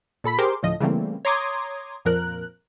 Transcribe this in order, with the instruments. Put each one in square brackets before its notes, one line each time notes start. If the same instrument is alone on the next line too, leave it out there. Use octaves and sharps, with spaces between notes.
[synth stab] A#2 A4 B5 B6
G4 G#4 A#4 C5 C6 D6
D2 A2 F3 D#5
C#3 E3 G3 A3 A#3 C4
C#5 A#5 C6 D6 D#6 G#6
F2 A#2 F3 A#4 F#6